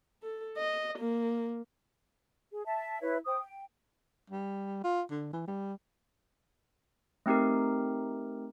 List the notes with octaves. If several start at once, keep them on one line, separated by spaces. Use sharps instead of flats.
A4
D#5
A#3
G#4
E5 A5
E4 B4 C#5 E5
C5 G5 D#6
G5
G3
F4
D3
E3
G3
A3 C4 D#4 G4 A#4